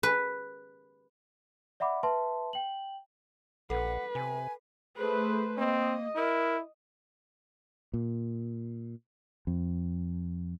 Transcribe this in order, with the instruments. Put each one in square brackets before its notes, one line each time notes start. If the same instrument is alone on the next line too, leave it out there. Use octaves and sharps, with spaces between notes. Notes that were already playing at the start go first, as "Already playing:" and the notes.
[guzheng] B4
[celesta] D5 E5 F#5 B5 D6
B4 E5 A5 C6
G5 F#7
[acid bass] A#1 [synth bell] A4 [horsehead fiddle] B4 [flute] F#5
[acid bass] C3 [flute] G#5
[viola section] A3 B4 C5 [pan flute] G#4
[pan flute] A#3 [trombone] C4 [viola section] D#5
[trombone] E4 [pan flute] A#4
[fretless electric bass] A#2
F2